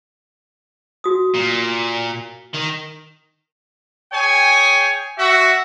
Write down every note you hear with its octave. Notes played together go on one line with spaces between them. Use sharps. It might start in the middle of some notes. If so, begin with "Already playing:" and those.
F#4 D#6
A#2
D#3
G#4 C#5 G5 G#5
F#4 E5